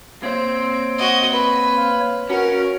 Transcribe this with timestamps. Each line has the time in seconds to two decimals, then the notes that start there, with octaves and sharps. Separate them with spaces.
0.23 A#3 C4 C5 C#5 D7
0.98 F#4 D#5
1.32 B4
1.77 F5
2.29 C#4 F#4 A#4